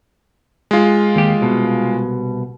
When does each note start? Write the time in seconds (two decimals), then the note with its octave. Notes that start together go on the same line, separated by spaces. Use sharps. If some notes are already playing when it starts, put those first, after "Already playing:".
0.71 G#3 F4
1.16 D#2 G4
1.41 C2 B2